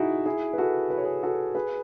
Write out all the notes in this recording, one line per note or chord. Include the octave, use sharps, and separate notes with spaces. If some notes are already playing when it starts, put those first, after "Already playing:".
Already playing: D#4 E4 F#4 G#4
E4 G#4
B4
F#4 A4
B4
C#5
G#4 B4
F#4 A4
G#4 B4